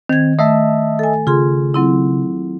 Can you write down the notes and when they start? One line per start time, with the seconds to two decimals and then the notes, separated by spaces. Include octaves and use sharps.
0.09 D#3 C4 G#6
0.39 A3 D#5 E5 A5
0.99 A4 G#5
1.27 C#3 F4 G#4 C6
1.74 F#3 C4 E4